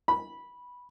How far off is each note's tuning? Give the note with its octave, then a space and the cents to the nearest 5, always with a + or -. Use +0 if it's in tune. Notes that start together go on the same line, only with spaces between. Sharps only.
B5 -10